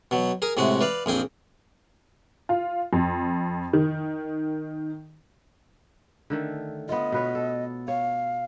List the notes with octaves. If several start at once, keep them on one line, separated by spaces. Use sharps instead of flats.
B2 F#3
G#4 A#4 D#6
A2 C3 G#3 F#4
B4 D5 F5
A#1 F2 G#4 G5
F4
F2
D#3
D3 D#3 A3
B3 F4 D#5
B2 B4 C#5
A4
C#5 F5